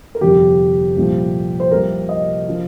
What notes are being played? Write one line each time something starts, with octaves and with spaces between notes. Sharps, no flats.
A#4
G1 F2 C3 F3 G4
C2 A#2 F3
C5
C2 C3 F3 A#4
D#5
F3